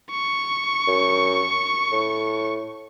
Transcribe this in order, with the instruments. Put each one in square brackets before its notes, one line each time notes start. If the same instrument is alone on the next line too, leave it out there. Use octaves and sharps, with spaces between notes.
[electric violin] C#6
[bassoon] F#2
A2